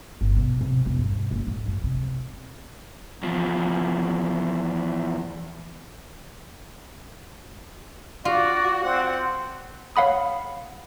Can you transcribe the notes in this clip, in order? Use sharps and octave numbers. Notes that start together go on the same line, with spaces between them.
G1
B2
C3
E1
G2
F#1
G#2
F#2
C3
E2 F3
F4 F#4 D5
C4 F#5
C#5 F5 F#5 B5 D#6